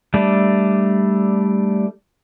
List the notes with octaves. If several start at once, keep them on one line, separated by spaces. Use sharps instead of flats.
G3 A3 D4